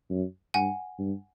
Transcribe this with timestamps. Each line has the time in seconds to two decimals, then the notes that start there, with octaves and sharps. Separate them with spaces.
0.10 F#2
0.54 G2 F#5 G#5
0.99 G2